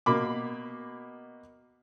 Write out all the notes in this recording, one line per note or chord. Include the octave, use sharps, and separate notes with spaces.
B2 A#3 B5 D6